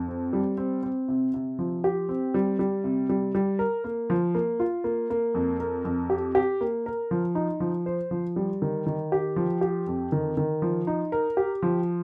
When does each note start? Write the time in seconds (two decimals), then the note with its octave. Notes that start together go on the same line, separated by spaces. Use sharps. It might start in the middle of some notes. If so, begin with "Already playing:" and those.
Already playing: F2
0.08 C4
0.33 G3
0.58 C4
0.83 C4
1.08 C3
1.34 C3
1.59 F3
1.84 G4
2.09 C4
2.34 G3
2.59 G3
2.84 C3
3.09 G3
3.35 G3
3.59 A#4
3.84 A#3
4.10 F3
4.35 A#3
4.60 F4
4.84 A#3
5.10 A#3
5.35 F2
5.60 A#4
5.85 F2
6.10 G4
6.35 G4
6.61 A#3
6.86 A#4
7.11 F3
7.35 D#4
7.60 F3
7.86 C5
8.11 F3
8.36 G3
8.62 D#3
8.86 D#3
9.12 G4
9.36 F3
9.61 G4
9.87 F2
10.12 D#3
10.37 D#3
10.62 F3
10.87 D#4
11.12 A#4
11.37 G4
11.62 F3